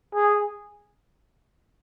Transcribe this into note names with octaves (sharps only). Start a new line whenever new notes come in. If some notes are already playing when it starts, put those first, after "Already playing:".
G#4